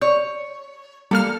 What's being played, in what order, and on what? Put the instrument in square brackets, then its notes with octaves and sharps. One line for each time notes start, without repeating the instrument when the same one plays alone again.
[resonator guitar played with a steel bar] C#5 [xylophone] D5
[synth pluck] G3 A#3 F6 [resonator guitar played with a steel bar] A4